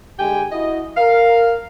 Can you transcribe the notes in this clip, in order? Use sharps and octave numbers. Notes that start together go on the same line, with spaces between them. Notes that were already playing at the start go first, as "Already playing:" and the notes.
D3 G#3 G4 G5 G#5
E4 F#4 D#5
A#4 F5